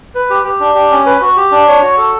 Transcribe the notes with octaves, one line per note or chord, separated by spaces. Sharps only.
B4
G4
G4
D4
G4
C#4
B4
F#4
G4
D4
C#5
F#4
A4